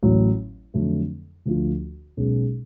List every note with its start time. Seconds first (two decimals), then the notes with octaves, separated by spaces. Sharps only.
0.03 A1 A2 F#3
0.74 F2 D3 F#3 A3
1.46 D2 D3 F3 A3 F4
2.17 B1 B2 G#3 C#4 G#4